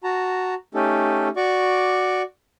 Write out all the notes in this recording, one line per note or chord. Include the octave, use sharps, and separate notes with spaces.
F#4 A5 A#5
A3 C#4 D#4 G4 A4
F#4 D5 C#6 D6